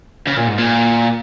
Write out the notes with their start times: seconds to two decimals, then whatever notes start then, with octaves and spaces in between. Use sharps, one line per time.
0.27 C#3
0.37 A#2
0.47 G#2
0.58 A#2